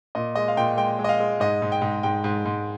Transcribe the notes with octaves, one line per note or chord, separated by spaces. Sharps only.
A#2 D#5
G#3 D#5
F5
A#2 G5
G#3 G5
G#3
D#5
F5
G#3
G#2 D#5
G#2
G5
G#2
G#2 G5
G#2
G#2